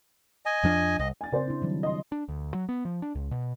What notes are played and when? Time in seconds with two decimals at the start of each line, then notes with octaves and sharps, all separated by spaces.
0.46 D#5 G#5
0.64 F2 F3 D4
0.99 C2 D#5
1.21 G#5 A6
1.32 C#3 C4 C5 D5
1.47 D4 E4
1.62 D#3 F#3 G3
1.83 D#5 C6
2.12 D4
2.29 D2
2.54 F#3
2.69 B3
2.85 F3
3.02 D4
3.15 C#2
3.31 B2